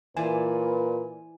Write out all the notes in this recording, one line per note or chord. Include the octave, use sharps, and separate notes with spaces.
A#2 E3 B4 C5 D5 G#5